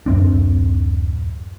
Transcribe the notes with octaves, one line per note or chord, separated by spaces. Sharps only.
D1 F#2 C4 D4